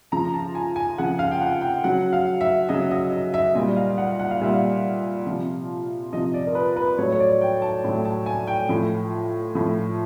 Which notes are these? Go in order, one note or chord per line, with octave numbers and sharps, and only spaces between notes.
C#3 F3 A#5
A5
G#5
G#5
C#3 F3 F#5
F5
G5
F#5
G5
C#3 F#3 F#5
F5
E5
C#3 F#3 D#5
D#5
D#5
E5
A#2 G3 D#5
F5
F#5
F#5
F5
A#2 G3 E5
F5
C3 F3
C3 F3 D#5
D5
A#4
B4
B4
A2 F#3 C#5
C#5
D5
G5
A5
A2 F#3
A5
G#5
G5
A2 F3
A2 F3